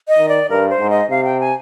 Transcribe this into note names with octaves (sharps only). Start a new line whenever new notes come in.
D#5
D#3
D5
G2 A#4
C5
G#2
D#5
C3 F5
G5
G#5